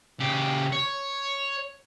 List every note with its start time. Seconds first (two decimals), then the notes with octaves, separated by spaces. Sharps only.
0.20 C#3 G4
0.72 C#5